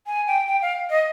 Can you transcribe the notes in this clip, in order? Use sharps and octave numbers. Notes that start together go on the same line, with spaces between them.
G#5
G5
G5
F5
D#5